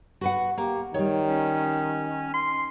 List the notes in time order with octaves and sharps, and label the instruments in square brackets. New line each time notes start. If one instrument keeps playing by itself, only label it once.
[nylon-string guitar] F#4 B4 F#5
[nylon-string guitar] A#3 [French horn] G4
[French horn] D#3 [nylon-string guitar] G3 C#5
[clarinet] C#4
C6